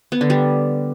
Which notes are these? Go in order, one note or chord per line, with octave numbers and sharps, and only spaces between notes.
B3
D3
G3